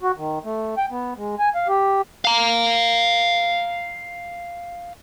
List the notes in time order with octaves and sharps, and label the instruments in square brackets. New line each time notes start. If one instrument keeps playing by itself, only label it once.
[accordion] F#4
D#3
A3
G5
B3
G#3
G#5
F5
G4
[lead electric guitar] F5 A#5